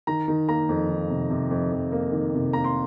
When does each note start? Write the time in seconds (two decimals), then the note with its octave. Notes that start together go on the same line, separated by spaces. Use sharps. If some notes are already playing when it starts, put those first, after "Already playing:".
0.07 D#3 A#5
0.28 D#3
0.49 A#3 A#5
0.69 F2
0.89 D#3
1.10 C3
1.30 C3
1.51 F2
1.72 F2
1.92 A#3
2.12 D#3
2.33 C3
2.53 A#3 A#5
2.64 C6